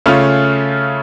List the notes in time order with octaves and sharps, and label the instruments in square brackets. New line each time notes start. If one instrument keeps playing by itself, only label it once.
[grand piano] C#3 A3 C#4 F4 F6